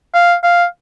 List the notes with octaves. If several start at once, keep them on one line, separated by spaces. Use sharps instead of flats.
F5
F5